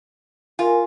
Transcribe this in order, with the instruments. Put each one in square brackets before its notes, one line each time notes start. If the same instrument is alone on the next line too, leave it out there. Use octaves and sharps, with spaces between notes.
[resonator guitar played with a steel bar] F4 [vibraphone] A#4 G#5